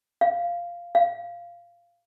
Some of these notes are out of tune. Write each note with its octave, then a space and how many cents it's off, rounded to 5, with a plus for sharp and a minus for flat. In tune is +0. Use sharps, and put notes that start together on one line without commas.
F5 -5
F5 -10